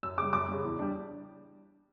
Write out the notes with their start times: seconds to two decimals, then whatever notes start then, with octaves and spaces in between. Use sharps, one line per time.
0.03 F#2 E6
0.17 C#3 G3 D6
0.33 F#2 D6
0.48 C#3 G3
0.65 E2
0.79 G3 D4